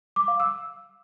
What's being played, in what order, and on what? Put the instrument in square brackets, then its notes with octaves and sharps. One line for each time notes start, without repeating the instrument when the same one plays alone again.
[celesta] D6
F5
E6